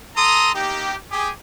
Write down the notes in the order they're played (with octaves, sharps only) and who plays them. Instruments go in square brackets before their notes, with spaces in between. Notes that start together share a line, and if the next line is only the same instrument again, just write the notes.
[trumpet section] A4 A#5 C6 D#6
A#3 D#4 G4
G4 G#4